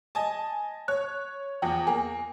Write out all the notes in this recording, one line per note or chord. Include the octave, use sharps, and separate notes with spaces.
D#5 G#5 A5
C#5 F#6
E2 F3 G5
A#3 G#5